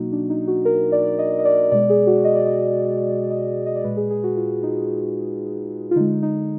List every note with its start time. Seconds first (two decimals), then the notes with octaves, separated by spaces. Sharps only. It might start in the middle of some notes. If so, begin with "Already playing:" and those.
Already playing: B2 F#3 A#3 D#4 F#4
0.12 D4
0.30 D#4
0.48 F#4
0.65 A#4
0.92 D5
1.19 D#5
1.39 D#5
1.45 D5
1.72 B2 G#3 D5
1.90 G#4
2.07 F#4
2.24 D#5
2.35 D5
2.46 D#5
3.31 D#5
3.66 D#5
3.75 D5
3.84 A#2 G#3 B4
3.97 G#4
4.10 G#4
4.24 F#4
4.37 F4
4.63 D#4
5.91 F4
5.96 D3 G#3 D#4
6.23 D#4